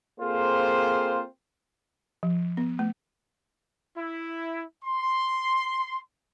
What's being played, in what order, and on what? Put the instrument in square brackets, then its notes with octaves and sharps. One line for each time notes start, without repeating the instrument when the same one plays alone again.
[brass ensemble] A#3 C4 F4 G#4 A4 C5
[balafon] F3
B3
A3
[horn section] E4
C6